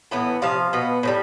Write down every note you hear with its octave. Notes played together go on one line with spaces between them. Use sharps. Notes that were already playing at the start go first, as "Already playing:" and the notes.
A2 E3 B3
C3 F3 F5
B2 B3
A2 E3 G3